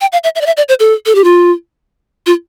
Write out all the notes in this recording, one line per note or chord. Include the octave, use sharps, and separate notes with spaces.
G5
F5
E5
E5
D5
E5
D5
C5
A4
A4
G4
F4
F4